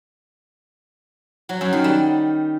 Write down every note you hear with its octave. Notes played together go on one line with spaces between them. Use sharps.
F#3
F#2
D#3
G3